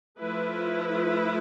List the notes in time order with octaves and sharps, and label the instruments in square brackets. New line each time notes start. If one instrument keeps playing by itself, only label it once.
[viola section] F3 A3 E4 B4